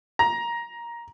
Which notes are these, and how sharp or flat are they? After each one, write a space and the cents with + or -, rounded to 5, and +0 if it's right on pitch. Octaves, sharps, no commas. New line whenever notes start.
A#5 +15